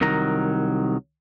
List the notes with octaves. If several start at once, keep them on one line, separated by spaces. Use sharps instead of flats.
C2 D#3 F#3 A#5